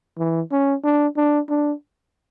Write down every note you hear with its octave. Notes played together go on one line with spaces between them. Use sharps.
E3
C#4
D4
D4
D4